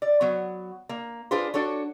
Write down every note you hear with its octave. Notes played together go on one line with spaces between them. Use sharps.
D5
F#3 B3
A#3
D4 F4 G#4 B4 C5
D4 F#4 A4 C#5